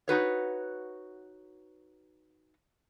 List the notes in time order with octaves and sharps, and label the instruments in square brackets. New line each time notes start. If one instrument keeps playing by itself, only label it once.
[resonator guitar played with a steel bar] D#4 F#4 B4 C#5